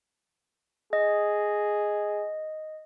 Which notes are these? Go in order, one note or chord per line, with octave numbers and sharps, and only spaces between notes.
G#4 D#5